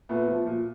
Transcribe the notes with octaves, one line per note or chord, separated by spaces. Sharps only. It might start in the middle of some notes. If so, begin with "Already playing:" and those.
A#2 A3 B3
F3
A#2